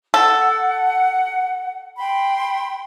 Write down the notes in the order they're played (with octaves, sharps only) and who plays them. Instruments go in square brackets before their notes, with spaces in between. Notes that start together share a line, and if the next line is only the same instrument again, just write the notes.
[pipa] A4 [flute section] F#5
[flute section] G5 B5 C6